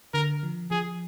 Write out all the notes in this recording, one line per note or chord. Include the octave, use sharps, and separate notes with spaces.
D3 A#4
F3
F3 G#4